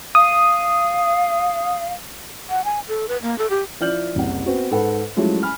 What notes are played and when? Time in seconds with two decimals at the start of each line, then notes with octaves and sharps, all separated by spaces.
0.15 F5 D#6
2.49 F#5
2.64 G#5
2.88 A4
3.08 B4
3.23 A#3
3.38 A4
3.50 G4
3.80 F3 E4 D5 F6 G6 F#7
4.15 F#1 C2 F#2 F#5
4.46 B3 C4 F#4
4.71 G#2 A4 B4 F#5 B5
5.16 F3 F#3 G#3 A3 C#4 E4
5.43 G#5 B5 F6